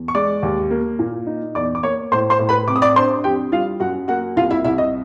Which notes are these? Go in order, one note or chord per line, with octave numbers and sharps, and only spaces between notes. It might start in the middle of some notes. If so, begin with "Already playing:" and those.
Already playing: E2
C#6
G#3 D5 D6
D#2
A#3
A#2
D#4
E2 D5 D6
D6
A#3 C#5 C#6
A2 C5 C6
C5 C6
A2
B4 B5
C3 D6
D#6
D5 D6
D4 C5 C6
F2 G4 G5
G3 F4 F5
F#2 F#4 F#5
A#3 F#4 F#5
C2 F4 F5
E4 E5
C2 E4 E5
D#5